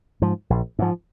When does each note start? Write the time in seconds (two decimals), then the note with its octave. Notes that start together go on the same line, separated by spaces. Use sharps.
0.22 G#2 F3
0.50 A#1
0.79 G#2 F3